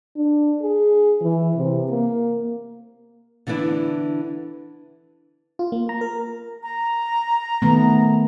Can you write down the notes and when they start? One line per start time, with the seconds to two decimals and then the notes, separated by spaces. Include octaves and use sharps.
0.16 D4
0.62 G#4
1.21 E3
1.57 C3
1.90 A#3
3.47 D3 E3 B3 D4 E4
5.59 F4
5.72 A#3
5.89 A#5
6.01 A#4
6.63 A#5
7.62 D#3 A3 B3